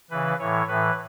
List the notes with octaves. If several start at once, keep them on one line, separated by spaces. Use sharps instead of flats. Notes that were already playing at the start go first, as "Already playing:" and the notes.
C#3 E3 B4
A2 E3 C#5
A2 E3 B4